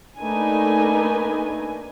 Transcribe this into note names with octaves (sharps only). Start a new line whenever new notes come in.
A3 A#3 D4 D#4 B4 G#5